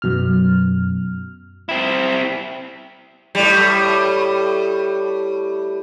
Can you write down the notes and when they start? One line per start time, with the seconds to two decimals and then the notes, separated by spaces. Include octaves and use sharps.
0.02 F#2 B2 F6
1.69 C4 E4
3.35 A2 G3